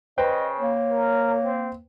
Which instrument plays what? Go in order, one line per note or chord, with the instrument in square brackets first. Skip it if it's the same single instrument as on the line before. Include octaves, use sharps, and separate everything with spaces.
[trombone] C#3 [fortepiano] B4 C5 G5 [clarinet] D#5
[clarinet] A#3 [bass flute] C#5
[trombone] A#4
C4